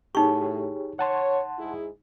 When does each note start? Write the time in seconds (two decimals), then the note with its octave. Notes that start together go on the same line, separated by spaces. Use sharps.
0.15 A2 D#4 G4 G#4 C#5 C#6
0.99 C#5 F#5 A5 C6
1.58 G#2 E4 G#4